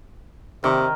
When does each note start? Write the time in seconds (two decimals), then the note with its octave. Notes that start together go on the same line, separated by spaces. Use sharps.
0.64 C3 D#3